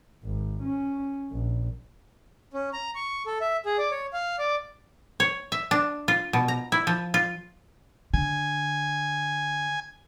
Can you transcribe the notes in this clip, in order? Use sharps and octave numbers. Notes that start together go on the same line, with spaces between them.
G#1
C#4
A#1
C#4
A#5
C#6
A4
E5
G#4
D5
C#5
F5
D5
C#5
E5
D4
F4
B2
A#5
E4
F3
F4
D3 G#5